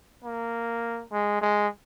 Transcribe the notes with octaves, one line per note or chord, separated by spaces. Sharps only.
A#3
G#3
G#3